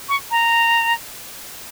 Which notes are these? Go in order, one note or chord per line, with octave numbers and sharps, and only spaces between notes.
C#6
A#5